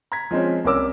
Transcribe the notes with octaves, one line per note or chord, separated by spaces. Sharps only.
A#5 G#6 B6
F3 G#3 C4 C#4
C2 C#4 A#4 D6 E6